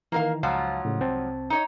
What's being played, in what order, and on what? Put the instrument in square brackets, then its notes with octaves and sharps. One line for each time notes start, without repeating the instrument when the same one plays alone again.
[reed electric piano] D#3 E3 [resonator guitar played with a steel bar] A#3 A#4 F5
[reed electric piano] C#2 F5 A5 [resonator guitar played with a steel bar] G#2 F3 F#3
[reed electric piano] A2 C#3
C2 C4 A5
[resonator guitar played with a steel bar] D#4 C#5 D#5